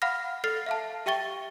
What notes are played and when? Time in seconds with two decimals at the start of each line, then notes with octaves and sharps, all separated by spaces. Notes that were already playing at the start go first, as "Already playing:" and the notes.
0.02 F5 F#5 B5 F6 A#6
0.44 A4 F6 A6 C7
0.66 E5 F5 A5
1.06 G4 E5 G5 C#6 A6 G7